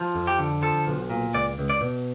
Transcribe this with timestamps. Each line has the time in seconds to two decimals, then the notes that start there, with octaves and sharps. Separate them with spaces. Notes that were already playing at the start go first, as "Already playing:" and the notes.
Already playing: F3
0.15 F2
0.27 G4
0.39 D3
0.62 F3 A4
0.87 B1
1.10 A#2
1.34 C#2 D5
1.58 C#2
1.70 D5
1.81 B2